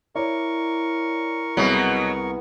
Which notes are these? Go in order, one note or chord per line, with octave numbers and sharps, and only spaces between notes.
E4 A#4 C#5 D5 C#6
C2 B2 F#3 B3 G#4 B4